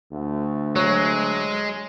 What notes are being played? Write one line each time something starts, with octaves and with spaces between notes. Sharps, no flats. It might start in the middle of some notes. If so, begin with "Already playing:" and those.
D2
F#3 G#3 C#5 E7